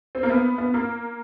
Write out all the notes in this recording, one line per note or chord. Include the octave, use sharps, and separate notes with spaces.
C4
A#3
B3
B3
A#3